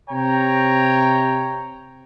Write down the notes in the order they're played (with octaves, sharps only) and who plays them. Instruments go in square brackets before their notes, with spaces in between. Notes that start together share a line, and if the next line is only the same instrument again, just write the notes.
[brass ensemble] C3 C#5 G5 A#5